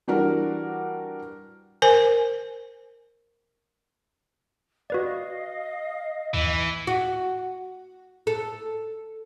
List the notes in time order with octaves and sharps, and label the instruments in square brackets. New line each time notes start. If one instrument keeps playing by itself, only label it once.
[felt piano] E3 G3 D4 F#4 A#4
[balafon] A#4 C5 G#5
[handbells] F#4 B4 D5 [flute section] D#5 F5
[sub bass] D#2 [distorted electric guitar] E3
[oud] F#4
A4